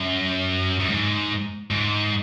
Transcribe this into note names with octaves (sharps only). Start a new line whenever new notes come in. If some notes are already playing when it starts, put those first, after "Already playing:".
Already playing: F#2
F#2
G#2
G#2